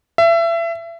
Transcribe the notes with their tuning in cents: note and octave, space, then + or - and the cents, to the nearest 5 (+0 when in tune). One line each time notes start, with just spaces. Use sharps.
E5 +30